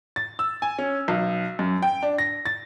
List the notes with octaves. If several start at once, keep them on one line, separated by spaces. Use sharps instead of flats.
A6
E6
G#5
C#4
B1
F#2
G5
D4
A#6
A6